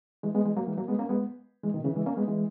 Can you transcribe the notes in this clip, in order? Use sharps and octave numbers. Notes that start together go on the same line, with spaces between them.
E3 G#3
G#3 B3
E3 G#3
F#3 A#3
E3 G#3
F#3 A#3
G#3 B3
A#3 C#4
G#3 B3
E3 G#3
B2 D#3
C#3 E3
E3 G#3
A#3 C#4
G#3 B3
E3 G#3